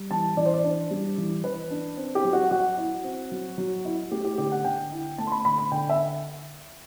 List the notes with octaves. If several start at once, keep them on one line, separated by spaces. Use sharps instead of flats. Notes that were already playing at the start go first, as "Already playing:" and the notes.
Already playing: G3
E3 A5
E3 D5
C5
D5
D4
G3
E3
E3 B4
D4
C4
G4
F#3
F#4
F#3 F#4
E4
C4
F#3
F#3
E4
A3 G4
G4
D3 G4
F#5
D3 G5
E4
A3 A5
C6
B5
D3 B5
B5
D3 G5
E5